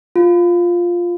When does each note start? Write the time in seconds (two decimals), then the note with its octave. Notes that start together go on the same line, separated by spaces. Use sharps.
0.16 F4